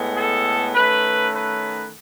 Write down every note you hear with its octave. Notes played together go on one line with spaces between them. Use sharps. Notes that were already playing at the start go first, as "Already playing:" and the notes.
Already playing: A2 G#3 B3
A4
D#3 A3 C#4 B4
B4